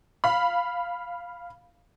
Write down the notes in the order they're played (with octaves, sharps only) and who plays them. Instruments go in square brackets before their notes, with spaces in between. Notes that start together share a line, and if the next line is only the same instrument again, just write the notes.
[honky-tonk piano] F5 B5